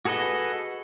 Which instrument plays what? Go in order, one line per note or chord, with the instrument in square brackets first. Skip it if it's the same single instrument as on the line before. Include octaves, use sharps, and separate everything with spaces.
[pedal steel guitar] F#4 G#4 A4 B4 D#5